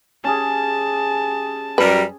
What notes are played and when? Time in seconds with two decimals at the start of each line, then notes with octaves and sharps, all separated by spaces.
0.24 C#4 G4 G#4 A5
1.78 F#2 G3 A#4 B4